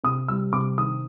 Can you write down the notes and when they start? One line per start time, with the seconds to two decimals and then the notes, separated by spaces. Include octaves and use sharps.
0.04 C3 D#6
0.28 G3 E6
0.53 C3 D6
0.78 D#3 D#6